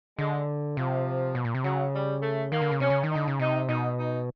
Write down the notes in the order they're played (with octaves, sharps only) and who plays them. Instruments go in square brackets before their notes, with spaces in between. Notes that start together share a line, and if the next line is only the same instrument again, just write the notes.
[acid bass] D3 [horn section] G#3
[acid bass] C3 [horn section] F3
[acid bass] B2
A#2
C3
[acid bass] C#3 [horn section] F#3
[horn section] G3
A3
[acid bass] D#3 [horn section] A#3
[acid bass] D3
C#3
[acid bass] C3 [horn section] C#4
[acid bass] C#3
D#3
[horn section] D#4
[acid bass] D3
C#3
[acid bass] C3 [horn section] D#4
[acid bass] B2 [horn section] D#4
[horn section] D#4